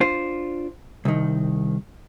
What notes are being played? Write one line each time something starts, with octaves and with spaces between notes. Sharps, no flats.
D4 F4 C5
C2 D#3